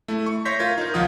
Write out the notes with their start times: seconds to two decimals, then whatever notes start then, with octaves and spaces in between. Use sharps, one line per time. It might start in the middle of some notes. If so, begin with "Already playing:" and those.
0.08 A3 E4
0.26 C#6
0.45 C#5 E5 C6 G6 A#6 B6
0.59 F4 A#4 G#6
0.78 D#4 A#4
0.94 C#2 D#3 F3 F4 F#5 D#6